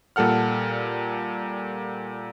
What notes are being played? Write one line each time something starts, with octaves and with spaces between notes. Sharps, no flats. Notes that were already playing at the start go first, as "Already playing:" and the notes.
A#2 G3 A4 F#5 F6